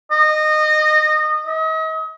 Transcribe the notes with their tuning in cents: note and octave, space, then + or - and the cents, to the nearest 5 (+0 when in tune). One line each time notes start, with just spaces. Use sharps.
D#5 -20
D#5 +40